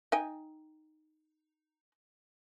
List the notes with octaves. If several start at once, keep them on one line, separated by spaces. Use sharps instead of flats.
D#4 G5 G#5